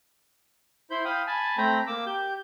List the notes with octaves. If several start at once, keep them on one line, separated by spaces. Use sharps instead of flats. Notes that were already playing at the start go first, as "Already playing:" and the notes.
E4 C5 B5 G6
F5 G5 B5 D#6
G#5 A5 B5
A3 C4 G5 A#5 B5
A#3 D6 E6
G4 G6